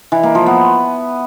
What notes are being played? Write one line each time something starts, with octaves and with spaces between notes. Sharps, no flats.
E3
A#3
F3
B3